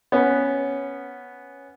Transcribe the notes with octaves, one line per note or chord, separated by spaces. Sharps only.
B3 C#4